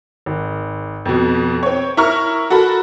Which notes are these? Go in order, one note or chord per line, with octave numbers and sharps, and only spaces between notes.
G#1
F2 B2
C4 C#5
E4 A#4 A#5 C#6 F6
F#4 A4 A#4 B5